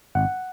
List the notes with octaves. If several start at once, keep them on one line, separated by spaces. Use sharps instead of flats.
G#1 F#5